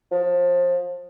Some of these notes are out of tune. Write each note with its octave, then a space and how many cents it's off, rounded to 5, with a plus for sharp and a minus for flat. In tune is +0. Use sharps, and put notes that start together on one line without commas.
F3 +25